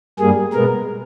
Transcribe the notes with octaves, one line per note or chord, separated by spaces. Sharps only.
G2 G3 A#3 G#4
B2 G#3 B3 A#4